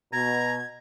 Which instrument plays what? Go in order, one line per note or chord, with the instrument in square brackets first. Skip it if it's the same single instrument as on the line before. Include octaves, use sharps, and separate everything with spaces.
[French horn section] B2 [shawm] A#5 [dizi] G#6